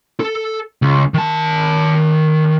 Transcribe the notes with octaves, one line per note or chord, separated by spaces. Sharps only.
A4
C#2
D#3 A5